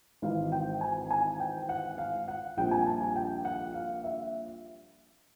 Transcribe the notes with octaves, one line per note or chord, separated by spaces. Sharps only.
G#1 G#2 E3 F5
G5
G#5
G#5
G5
F#5
F5
F#5
A#1 A#2 G3 C4 G5
G#5
A5
G#5
G5
F#5
F5
E5